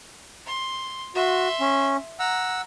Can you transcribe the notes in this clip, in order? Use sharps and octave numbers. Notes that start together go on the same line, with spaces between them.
C6
F#4 E5 C6
C#4
F#5 A#5 E6